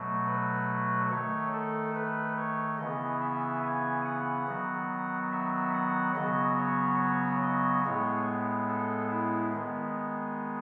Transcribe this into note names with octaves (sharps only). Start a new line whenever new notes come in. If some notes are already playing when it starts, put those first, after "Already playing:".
Already playing: B2 F#3 A3
B4
D#3 A3 C#5
A4
B4
C#5
C#3 E3 B3 D#5
E5
G#5
F#5
D#3 F#3 B3
E5
F#5
C#3 F#3 B3 D#5
C#5
C#5
D#5
A2 G#3 B3 C#5
A4
E4
D#3 G#3 B3